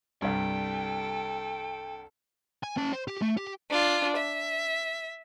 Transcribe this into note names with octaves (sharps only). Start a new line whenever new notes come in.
C2 G2 A4 G5
G#5
C#4 A5
C5
G4
A3
G4
D4 F4
E5